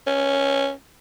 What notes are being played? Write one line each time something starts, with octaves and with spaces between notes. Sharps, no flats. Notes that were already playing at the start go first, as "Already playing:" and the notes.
C#4